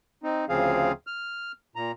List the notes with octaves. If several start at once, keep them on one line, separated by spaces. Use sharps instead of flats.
C4 D#4
D2 C#3 F3 C4 G#4 F5
F6
A#2 A#5